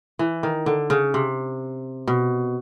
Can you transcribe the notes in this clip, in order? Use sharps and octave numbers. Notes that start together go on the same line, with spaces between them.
E3
D#3
D3
C#3
C3
B2